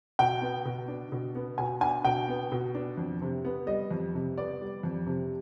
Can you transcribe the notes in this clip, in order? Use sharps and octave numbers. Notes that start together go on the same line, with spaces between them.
B2 G5
B3
B2
D4
B2
B3
B2 G#5
D4 G#5
B2 G5
B3
B2
D4
F2
C3
B3
G3 D#5
F2
C3
B3 D5
G3
F2
C3